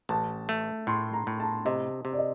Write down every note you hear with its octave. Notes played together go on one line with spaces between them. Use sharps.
A1 A5
A3
A2 C6
A#5
A2
A5
C3 D#5
C3
D5
D#5